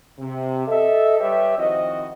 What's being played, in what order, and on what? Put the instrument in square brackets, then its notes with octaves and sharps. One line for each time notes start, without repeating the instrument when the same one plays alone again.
[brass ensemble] C3
A4 D#5 E5
G3 G4 B4 C#5 E5
D#3 F3 C4 E4 F#4 D#5